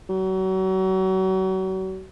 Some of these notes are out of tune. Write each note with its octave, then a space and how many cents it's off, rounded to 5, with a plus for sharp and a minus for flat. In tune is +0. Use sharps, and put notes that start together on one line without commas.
F#3 +35